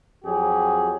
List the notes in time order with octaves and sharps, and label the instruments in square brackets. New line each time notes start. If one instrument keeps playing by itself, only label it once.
[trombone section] F2 F#3 G4 G#4